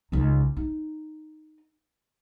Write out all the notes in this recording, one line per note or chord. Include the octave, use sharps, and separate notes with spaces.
C#2 D#4
D#4